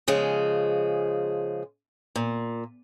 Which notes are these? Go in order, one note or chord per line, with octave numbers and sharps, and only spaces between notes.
C#3 F3 G#3
A#2